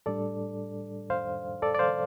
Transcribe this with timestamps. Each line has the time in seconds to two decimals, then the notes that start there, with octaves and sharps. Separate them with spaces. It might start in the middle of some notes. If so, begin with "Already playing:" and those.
0.06 A2 G3 D4 A4 D5
1.10 C5 F5
1.62 A4 D5
1.75 D5
1.79 C5 F5